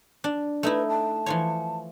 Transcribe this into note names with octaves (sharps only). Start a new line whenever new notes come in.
D4
A3 D#4 E4 B4
A5
E3 F3 C#5